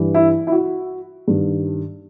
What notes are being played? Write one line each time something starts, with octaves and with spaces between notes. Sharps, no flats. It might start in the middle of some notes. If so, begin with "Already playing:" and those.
Already playing: G2 E3
E4
E4
F#4
G2 D#3